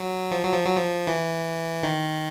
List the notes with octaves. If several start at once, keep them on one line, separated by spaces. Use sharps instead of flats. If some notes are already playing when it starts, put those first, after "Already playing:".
Already playing: F#3
F3
F#3
F3
F#3
F3
E3
D#3